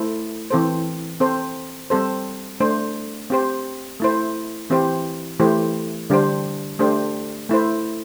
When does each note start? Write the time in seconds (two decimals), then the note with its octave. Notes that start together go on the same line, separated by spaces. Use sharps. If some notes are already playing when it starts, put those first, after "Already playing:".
Already playing: A3 E4 A4 C5
0.51 E3 C4 A4 C5
1.20 C4 A4 C5
1.90 G3 C4 A4 C5
2.60 A3 D4 C5
3.30 C4 G4 C5
4.00 A3 E4 C5
4.70 E3 C4 E4 G4 C5
5.40 E3 A3 E4 G4 C5
6.10 D3 G3 D4 G4 C5
6.79 A3 D4 G4 C5
7.49 A3 E4 C5